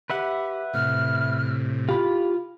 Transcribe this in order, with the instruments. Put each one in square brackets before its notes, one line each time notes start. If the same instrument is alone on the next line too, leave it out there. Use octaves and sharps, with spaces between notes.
[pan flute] G4 [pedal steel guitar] B4 E5 F#5
[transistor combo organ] A2 C3 [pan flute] F6
[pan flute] E4 [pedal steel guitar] F4 [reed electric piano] G4 B5